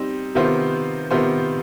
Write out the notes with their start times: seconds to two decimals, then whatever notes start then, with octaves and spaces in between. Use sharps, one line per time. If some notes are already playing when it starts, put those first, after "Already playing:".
Already playing: G3 C4 D#4
0.35 C3 D#3 B3 F4 C5
1.11 C3 D#3 B3 F4 C5